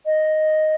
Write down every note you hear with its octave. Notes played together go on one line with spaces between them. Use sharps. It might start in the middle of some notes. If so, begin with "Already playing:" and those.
D#5